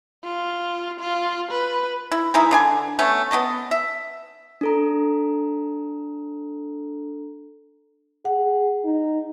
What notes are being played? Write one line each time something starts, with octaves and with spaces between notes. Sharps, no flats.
F4
F4
B4
E4
E3 G#3 D#4 E4
D3 D4 G#5
A3 B3 C#4
B3 D4 D#5 A5
E5
D4 A4 A#5
G#4 F#5
D#4